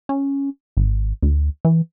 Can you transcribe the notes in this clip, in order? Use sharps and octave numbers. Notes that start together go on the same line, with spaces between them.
C#4
G#1
D2
E3